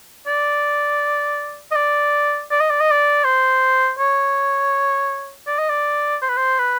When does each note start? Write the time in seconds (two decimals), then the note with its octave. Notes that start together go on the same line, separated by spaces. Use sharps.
0.27 D5
1.71 D#5
1.75 D5
2.51 D5
2.60 D#5
2.70 D5
2.80 D#5
2.91 D5
3.25 C5
3.99 C#5
5.47 D5
5.58 D#5
5.69 D5
6.22 C5
6.29 B4
6.37 C5
6.59 B4